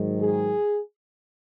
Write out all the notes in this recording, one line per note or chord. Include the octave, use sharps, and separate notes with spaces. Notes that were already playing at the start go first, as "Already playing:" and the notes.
Already playing: G#2 D#3 F#3
G#4